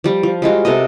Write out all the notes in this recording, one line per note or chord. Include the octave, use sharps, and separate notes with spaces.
F3 G3
F3
G3 G#3 F4 F#4
C3 A4 A#4 D#5